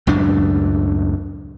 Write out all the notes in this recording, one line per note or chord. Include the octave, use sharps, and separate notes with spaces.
C#2 F#2 A2 D4